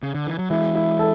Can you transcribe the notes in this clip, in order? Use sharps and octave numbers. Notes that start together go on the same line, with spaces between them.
C#3
D3
E3
F#3
E3 G#3 E4
E4
A4